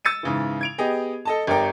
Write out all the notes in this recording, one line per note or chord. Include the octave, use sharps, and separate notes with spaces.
E6 A6 C#7 D#7
G#2 C#3 E3
G#6 D7 F7
B3 G4 G#4 D#5
A4 D#5 A5
G1 G4 A#4 D5 G5 A#5